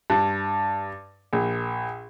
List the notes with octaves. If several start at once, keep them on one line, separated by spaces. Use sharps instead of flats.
G2
A#1